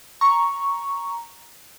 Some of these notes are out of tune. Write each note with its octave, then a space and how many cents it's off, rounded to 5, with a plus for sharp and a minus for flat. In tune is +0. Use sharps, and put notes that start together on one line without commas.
A#5 +0 C#6 +0